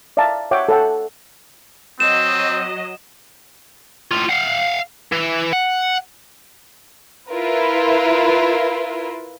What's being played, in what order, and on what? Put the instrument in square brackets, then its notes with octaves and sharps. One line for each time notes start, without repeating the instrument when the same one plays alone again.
[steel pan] D5 E5 F5 G5 A5 A#5
C#5 E5 F#5 G5 D6
A4 C#5 E5 F#5 G5
[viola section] F#3 D#5 [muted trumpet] C4 [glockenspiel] E7
[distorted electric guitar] A2 F4
F5 F#5
E3
F#5
[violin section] E4 F4 A#4 B4